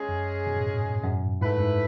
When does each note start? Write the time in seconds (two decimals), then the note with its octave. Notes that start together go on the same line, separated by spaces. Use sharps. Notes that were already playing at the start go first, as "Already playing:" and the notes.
Already playing: G#3 C#4 G#4
0.09 F#2
0.47 B2
0.56 A2
0.67 G#2
1.04 F#2
1.41 G#2 A3 E4 B4
1.57 F#2
1.60 G#2